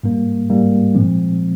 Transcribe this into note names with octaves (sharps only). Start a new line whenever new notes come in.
G#2 G3 A#3
G#2 G3 A#3
A#2 F3 G#3 C4